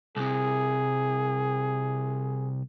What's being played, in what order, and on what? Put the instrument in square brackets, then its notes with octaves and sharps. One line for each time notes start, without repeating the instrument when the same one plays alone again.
[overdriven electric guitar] C2 C3 [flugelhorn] G#4